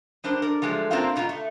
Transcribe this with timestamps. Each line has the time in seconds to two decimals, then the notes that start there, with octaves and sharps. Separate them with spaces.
0.24 G3 D4 A#4 C5
0.42 A#4 D5
0.62 F3 F#3 G#3 A3
0.91 A#3 C4 D4 F4 A#4 F5
1.16 G#2 B2 F4 A#5
1.29 A3